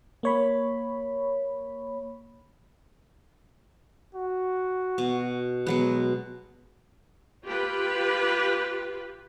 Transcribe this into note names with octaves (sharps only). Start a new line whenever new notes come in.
A#3 C#5 B5
F#4
B2
B2 F#3 G#3 B4
F4 G4 B4